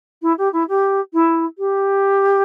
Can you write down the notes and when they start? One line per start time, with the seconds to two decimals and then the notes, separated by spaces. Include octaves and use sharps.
0.22 E4
0.38 G4
0.52 E4
0.68 G4
1.13 E4
1.58 G4